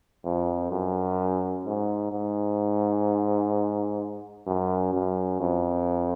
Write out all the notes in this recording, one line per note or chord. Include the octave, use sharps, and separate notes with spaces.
F2
F#2
G#2
G#2
F#2
F#2
F2